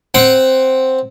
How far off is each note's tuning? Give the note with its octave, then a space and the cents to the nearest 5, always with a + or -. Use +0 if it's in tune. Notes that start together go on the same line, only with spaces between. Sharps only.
C4 +0 F#5 +15